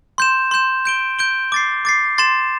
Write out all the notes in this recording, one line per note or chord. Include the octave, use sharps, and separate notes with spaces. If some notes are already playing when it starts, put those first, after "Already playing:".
C6 G6 E7
C6 G6 E7
G6 D7 G7
G6 D7 G7
D6 A6 C7
D6 A6 C7
C6 A6 E7